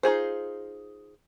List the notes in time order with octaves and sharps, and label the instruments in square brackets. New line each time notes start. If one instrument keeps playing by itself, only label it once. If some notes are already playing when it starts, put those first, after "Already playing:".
[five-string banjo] D#4 F4 G#4 C5